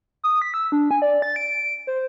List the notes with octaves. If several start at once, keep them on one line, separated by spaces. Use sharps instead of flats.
D#6
B6
E6
D4
G#5
D5
A6
D7
C5